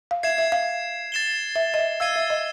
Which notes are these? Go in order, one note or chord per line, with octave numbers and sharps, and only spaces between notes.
F5
E5 G#6 C7 E7
E5
F5
A6 C7 E7 G7
E5
D#5
E5
F5 E6 G#6 C7 D#7
E5
D#5